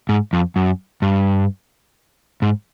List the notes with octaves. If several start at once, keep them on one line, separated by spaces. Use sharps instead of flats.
G#2
F2
F#2
G2
G#2